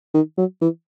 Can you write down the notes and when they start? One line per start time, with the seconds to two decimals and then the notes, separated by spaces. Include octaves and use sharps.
0.14 D#3
0.37 F#3
0.61 E3